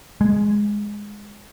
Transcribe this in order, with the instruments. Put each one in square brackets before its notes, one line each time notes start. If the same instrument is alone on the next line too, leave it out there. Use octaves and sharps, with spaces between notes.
[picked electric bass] G#3